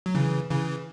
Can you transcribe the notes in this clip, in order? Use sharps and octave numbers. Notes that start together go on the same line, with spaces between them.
F#3
C#3 E3
C#3 E3